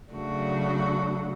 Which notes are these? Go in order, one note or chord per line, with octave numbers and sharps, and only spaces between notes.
C#3 F#3 A3 D4 F#4